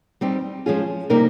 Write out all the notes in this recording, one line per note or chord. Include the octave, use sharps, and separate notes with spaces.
G3 C4 D#4 G4
F3 G#3 C#4 F4 G#4
C3 G3 A#3 D#4 A#4